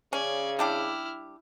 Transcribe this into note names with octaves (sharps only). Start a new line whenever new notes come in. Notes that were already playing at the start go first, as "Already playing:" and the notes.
C#3 C#4 D5 G#6
G3 D4 E4 G4 F6